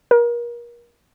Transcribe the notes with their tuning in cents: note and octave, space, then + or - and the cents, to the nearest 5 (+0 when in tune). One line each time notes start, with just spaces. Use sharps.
A#4 +35